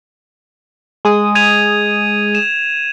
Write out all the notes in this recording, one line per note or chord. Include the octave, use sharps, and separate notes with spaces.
G#3 G#4 D#6
G#6 D#7 F7
E7